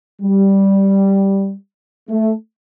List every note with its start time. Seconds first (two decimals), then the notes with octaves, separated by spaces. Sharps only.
0.22 G3
2.10 A3